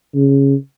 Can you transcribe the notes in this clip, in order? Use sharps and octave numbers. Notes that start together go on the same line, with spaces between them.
C#3